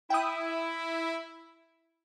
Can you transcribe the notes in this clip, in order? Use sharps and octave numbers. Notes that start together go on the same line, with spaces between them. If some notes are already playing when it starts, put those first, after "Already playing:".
E4 G5 D#6